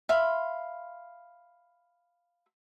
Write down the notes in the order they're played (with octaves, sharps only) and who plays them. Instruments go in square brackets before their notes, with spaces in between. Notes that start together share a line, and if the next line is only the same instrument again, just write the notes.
[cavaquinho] E5 F5 B5 C6